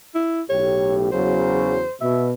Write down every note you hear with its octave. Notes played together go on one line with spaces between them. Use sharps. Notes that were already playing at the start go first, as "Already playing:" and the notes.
E4
B1 A2 G4 C#5
E2 C#3 F#3 C5
B2 E5